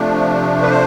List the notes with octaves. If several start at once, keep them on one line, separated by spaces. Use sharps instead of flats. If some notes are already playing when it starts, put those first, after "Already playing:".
Already playing: C3 F3 A3 D4
B4
C5